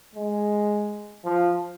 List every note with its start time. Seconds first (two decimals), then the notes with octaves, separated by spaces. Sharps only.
0.15 G#3
1.25 F3